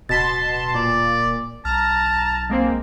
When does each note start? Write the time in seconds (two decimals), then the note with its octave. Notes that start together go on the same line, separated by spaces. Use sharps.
0.09 D1 B2 A5 C6 A6 B6
0.75 A#2 D5
1.65 B1 A5 A#5 F6
2.50 G#3 A#3 C4